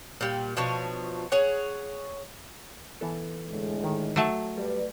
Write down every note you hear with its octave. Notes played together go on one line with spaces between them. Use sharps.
A#2 G3
B2 F3 D4 C#5
G#4 C#5 F#5
E3 B3 A4
A2 D3 G#3
D#3
F#3 A3 A5
G3 B4 D5